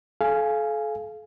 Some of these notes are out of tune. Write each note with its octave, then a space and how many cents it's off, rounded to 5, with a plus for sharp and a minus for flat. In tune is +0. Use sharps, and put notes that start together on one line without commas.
A4 -40 F5 -15 G#5 +0